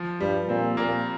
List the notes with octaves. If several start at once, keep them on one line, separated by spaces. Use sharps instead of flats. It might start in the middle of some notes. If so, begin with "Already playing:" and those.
Already playing: F3
G2 G3
A#2 C4
A#2 A#3